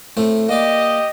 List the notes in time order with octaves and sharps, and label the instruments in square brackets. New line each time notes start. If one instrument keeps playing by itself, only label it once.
[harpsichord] A2 A3 C4
[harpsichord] A#3 D5 [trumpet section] G4 D#5